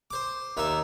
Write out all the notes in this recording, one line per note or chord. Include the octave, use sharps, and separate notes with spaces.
C5 D6
D#2 D#4 E5